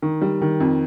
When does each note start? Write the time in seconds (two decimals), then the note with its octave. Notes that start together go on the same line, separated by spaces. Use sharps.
0.02 D#3
0.21 G3
0.42 D#3
0.60 F2